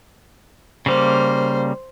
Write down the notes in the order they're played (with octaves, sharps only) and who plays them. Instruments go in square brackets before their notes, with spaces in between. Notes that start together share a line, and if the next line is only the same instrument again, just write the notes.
[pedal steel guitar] C#3 G3 A#3 [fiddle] C5